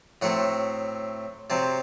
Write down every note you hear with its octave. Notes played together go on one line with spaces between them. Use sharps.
A2 F#3 A3 C4 F#5
C3 F#3 C4 A5